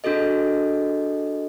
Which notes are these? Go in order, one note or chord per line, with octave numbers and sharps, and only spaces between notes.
D4 F#4 G#4 A4 D#5